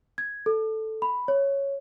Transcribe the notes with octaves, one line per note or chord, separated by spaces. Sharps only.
G#6
A4
B5
C#5